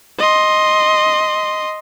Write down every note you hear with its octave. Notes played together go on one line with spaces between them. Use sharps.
D#5 C6